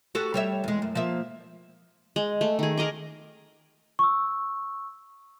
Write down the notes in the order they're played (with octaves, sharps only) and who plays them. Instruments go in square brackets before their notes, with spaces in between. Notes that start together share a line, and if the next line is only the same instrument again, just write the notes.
[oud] F#4 G4 A4
G3 C#5 E5
E2 G#3
F#2
F3 A#3 E5
[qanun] G#3
A3
D#3 G#4
G#4 A#4 D#5 D6
[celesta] C#6 E6